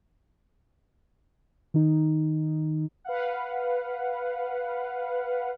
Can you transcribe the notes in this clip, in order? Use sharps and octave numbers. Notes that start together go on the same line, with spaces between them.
D#3 D#4
B4 F5 F#5